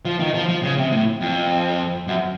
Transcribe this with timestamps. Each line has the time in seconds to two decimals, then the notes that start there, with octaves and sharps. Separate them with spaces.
0.05 F3
0.20 D#3
0.34 F3
0.49 F3
0.63 C#3
0.78 C3
0.92 A2
1.21 F2
2.07 F#2